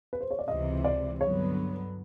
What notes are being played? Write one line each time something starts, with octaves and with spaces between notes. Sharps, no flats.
B4
C5
C#5
D5
C#2 C3 E3 D#5
D5
G2 D3 F#3 B3 C#5